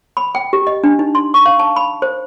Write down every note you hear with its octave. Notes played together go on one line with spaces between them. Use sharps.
B5
G5
G4
D#5
D4
D#4
C6
C#6
F5
A5
B5
C5